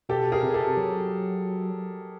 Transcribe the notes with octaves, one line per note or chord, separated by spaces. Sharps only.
B2 G4 A4
G#4 A#4
C3
G4 A4
F#3